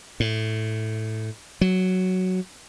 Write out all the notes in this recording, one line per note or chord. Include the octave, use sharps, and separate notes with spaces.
A2
F#3